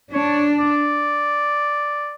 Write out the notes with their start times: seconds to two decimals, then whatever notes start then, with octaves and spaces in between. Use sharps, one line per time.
0.13 D4 C#5
0.58 D5